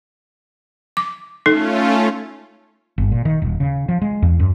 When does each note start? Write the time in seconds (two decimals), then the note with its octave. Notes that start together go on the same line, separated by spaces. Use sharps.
0.97 D6
1.46 A3 C#4 D#4 F4 A4
2.98 G1
3.12 A#2
3.25 D#3
3.42 D#1
3.60 C#3
3.89 F3
4.02 G#3
4.23 E2
4.40 F#2